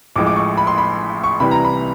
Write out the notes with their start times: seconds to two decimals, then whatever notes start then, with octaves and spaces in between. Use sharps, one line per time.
0.16 A1 A2 F3 G#3 D6
0.27 D6
0.36 C#6
0.58 B5
0.67 C6
0.78 B5
1.24 C#6
1.40 C2 C3 E3 G3 B5
1.51 A#5
1.65 B5